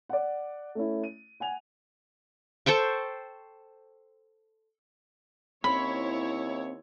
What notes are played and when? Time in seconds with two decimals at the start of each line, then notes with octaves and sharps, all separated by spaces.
0.09 D5 F#5
0.75 A3 C#4 E4
1.03 D#7
1.40 F#5 G#5 F7
2.66 A4 C5 G5 C#6
5.64 D#2 C4 C#4 E4 C5 C#5 B5